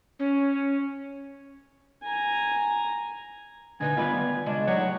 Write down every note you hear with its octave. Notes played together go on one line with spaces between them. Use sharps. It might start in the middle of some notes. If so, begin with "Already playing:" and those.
C#4
G#5 A#5
D3 D#4 B4 D#5 G#5
D#3 G3 B3 F4 B4
C#3 G#3 D4
F#3 D#4 G4 C#5 F#5